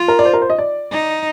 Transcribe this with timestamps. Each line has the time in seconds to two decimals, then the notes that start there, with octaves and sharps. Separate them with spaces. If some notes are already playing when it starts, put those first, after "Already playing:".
Already playing: F4
0.08 A#4
0.19 D5
0.25 C5
0.33 A#4
0.42 C5
0.50 D#5
0.58 D5
0.92 D#4